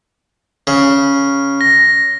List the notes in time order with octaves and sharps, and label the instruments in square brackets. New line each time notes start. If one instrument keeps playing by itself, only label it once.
[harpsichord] C#3
[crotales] A#6